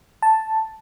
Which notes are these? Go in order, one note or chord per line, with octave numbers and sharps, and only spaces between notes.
A5